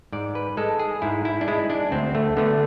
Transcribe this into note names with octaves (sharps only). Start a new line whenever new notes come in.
G#2 D5
B4
G#3 A4
G#4
G#2 E4
E4
D4
G#3 E4
D4
D2 C4
A3
D3 A3 B3